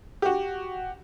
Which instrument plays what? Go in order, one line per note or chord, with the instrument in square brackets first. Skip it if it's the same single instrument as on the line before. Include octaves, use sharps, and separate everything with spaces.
[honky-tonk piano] F#4 G4